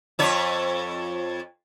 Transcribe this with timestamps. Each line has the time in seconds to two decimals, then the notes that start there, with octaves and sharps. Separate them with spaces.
0.19 F2 C#5